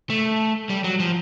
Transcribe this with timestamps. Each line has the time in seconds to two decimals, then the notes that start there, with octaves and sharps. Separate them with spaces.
0.10 A3
0.69 G3
0.84 F#3
1.00 F3